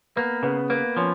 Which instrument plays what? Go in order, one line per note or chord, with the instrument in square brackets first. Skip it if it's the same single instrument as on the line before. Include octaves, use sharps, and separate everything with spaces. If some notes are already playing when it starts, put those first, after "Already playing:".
[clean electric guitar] A#3 [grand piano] B3 B4
[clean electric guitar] C#3 [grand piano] B3 B4
[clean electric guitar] A#3 [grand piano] B3 B4
[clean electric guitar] F3 [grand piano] C#4 C#5